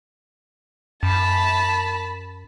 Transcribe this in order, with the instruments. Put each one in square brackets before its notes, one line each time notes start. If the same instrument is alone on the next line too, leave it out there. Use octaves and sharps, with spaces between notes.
[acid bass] F#2 [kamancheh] A5 B5